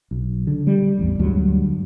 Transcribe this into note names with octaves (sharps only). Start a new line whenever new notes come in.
B1
D3
G3
A1 E2
D2 G2 F#3 G#3